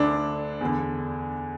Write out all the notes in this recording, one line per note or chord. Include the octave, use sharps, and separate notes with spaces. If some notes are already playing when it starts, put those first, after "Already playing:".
Already playing: D2 D3 D4
E2 D3